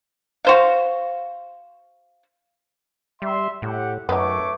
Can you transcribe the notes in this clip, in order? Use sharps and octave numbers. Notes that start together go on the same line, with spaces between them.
F#4 C5 F5
G3 E5 C6
A2 G4 F#5
F#2 A3 B3 D#4 C#5 D6